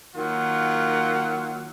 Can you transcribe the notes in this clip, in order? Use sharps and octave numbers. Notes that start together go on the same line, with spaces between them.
D#3 F#3 A#3 F4 F#5